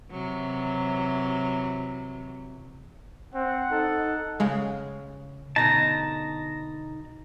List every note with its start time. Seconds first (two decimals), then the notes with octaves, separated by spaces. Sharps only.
0.11 C3 E3 F#3
3.34 C4 F#5
3.72 D#4 A4
4.40 C#3 G#3 F5
5.56 B2 D3 D#4 A5 A#5